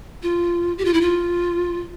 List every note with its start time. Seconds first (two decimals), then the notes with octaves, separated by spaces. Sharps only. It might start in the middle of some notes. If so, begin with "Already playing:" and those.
0.23 F4
0.78 G4
0.85 F4
0.94 E4
1.01 F4